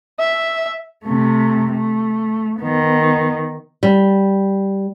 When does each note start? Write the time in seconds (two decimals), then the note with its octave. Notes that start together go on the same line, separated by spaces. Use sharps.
0.20 E5
1.04 C3 A3
1.71 A3
2.59 D#3 B3
3.83 G3